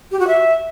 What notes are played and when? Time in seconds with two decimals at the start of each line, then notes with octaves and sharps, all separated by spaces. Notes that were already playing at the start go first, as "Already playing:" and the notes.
0.11 G4
0.19 F#4
0.27 E5